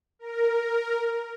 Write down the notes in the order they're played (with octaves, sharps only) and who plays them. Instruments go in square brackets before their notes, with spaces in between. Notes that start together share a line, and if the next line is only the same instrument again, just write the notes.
[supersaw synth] A#4